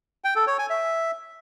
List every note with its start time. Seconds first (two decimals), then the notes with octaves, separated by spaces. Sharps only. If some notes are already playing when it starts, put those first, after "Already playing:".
0.24 G5
0.36 A4
0.47 C#5
0.59 G#5
0.70 E5